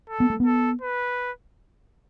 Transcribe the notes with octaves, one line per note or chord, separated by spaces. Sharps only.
A4
B3
A3
B3
A4
B4